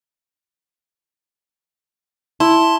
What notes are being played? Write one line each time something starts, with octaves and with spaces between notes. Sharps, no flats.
E4 A5 C6